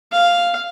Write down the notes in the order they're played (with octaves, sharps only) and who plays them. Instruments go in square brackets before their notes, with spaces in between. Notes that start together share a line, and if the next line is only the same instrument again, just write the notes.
[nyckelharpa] F5